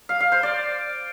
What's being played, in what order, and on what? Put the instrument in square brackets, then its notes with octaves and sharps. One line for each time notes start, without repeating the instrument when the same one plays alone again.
[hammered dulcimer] F5
F5
C5
D5